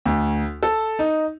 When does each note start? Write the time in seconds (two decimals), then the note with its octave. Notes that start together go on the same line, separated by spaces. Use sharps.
0.06 D2
0.63 A4
0.99 D#4